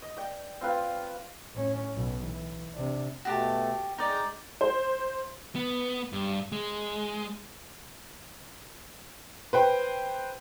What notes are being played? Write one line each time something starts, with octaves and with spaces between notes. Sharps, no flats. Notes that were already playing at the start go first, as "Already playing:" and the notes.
D#5
D5 G5
C4 F4 B4 F5
A2 C#4
B1 B2
E3
C3 D4
B2 A3 F#4 G4 A5
G#3 D#4 D5 G5 A#5
C5
B3
G2
G#3
B4 C5 G5